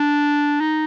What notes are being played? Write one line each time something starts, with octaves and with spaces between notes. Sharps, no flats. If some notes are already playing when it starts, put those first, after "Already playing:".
Already playing: D4
D#4